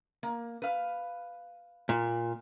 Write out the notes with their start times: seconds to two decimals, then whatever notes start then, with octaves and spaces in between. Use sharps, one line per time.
0.23 A#3
0.62 B4 F5
1.89 A#2